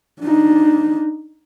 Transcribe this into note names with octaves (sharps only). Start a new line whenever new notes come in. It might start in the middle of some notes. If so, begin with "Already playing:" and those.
D4 D#4